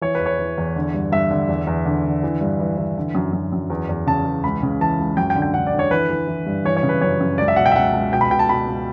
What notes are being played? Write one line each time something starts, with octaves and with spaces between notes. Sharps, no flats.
E3 C#5
E2 B4
C#5
E3
E2
D3
G2
G2 E5
D3
E2
E2
D3
D3
E3
G2
E3
E3
D3
F#2
F#2
F#2
E2
E2
C#3 A5
E2
C#2 B5
C#3
E3 A5
C#2
F#2 G5
G5
D3
G5
D3 F#5
D5
D3
C#5
E3 B4
E3
E3
G2
E3 C#5
C#5
C#3
B4
F#2 C#5
F#2
C#2 D5
E5
B2 F#5
G5
E5
C#2 F#5
C#2
B2 G5
B5
B2 G5
A5
B2 B5
C#2